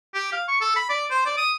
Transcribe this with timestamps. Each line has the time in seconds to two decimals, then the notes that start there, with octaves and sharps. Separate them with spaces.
0.14 G4
0.32 F5
0.48 C#6
0.61 A4
0.76 B5
0.89 D5
1.11 C5
1.25 D5
1.37 D#6